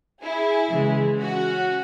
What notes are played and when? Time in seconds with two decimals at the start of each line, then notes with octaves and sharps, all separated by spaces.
0.23 E4 G#4
0.71 C#3 E3 G#3
1.20 C#4 F#4